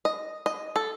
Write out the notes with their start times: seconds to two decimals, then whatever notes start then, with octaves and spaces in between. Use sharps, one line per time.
0.05 D#5
0.46 D#5
0.76 A4